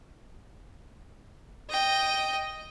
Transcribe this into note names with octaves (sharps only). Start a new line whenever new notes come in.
D#5 G5